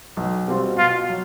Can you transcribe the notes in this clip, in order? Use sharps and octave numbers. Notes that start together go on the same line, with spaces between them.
B1
B2 G3 C4 F4
B2 F4
F#3